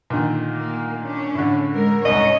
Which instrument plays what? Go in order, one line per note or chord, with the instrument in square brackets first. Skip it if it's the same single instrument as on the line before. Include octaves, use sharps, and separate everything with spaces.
[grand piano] A#2 D3 D#3
[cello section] A#3
C#4 D4
[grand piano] A2 D3
[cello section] G#3 A#4
[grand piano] C2 G#2 [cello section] C#4 C#5 [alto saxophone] D#5